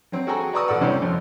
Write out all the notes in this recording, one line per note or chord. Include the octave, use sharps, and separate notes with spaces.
F#3 C4
F#4 G#4 A4 G5 G#5 A#5
B4 D5 A#5 C#6 D#6 E6
A1 A4 D5 F#5 E6 F6
A2 C3 F#3 G3 C#4 C5
F2